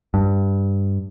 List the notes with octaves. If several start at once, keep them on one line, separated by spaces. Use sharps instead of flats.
G2